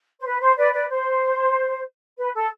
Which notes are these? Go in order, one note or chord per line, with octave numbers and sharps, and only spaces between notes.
C5
B4
C5
B4 D5
B4 D5
C5
B4
A4